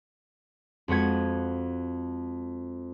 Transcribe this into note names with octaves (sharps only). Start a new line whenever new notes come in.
F2 G#3 F#4 B4 F#5 G#6